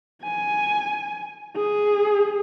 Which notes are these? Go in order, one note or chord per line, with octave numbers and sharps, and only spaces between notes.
G#5
G#4